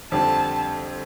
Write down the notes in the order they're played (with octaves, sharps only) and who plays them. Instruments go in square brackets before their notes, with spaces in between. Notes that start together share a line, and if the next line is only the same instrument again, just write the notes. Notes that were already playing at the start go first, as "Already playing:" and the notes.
[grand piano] F2 D3 G3 C4 [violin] A5